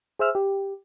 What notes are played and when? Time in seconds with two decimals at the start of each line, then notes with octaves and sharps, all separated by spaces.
0.19 G#4 C5 E5 E6 F6
0.35 G4